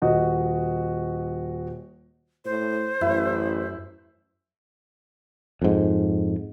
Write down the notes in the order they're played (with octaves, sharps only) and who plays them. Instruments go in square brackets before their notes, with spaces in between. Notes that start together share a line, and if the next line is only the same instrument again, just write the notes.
[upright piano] D#1 F#4 D#5
[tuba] A2 [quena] C5
[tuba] A1 [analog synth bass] F#2 [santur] E4
[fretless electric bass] F2 G#2